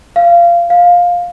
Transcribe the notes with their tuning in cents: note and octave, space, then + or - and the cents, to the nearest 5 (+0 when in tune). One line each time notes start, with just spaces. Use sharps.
F5 -20
F5 +15